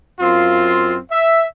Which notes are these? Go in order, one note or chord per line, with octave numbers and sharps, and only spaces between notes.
F#2 C4 F4
E5